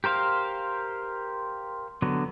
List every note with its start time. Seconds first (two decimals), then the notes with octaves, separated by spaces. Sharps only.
0.04 G4 A#4 C5 F5
2.02 D3 F#3 B3